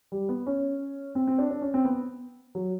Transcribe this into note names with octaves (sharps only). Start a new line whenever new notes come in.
G3
B3
C#4
C4
C4
D4
D4
C#4
C4
B3
F#3